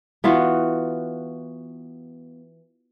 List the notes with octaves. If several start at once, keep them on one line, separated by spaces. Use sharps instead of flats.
E3 B3 F4 F#4